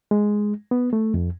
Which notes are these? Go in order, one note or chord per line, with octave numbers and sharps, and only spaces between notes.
G#3
B3
A3
F2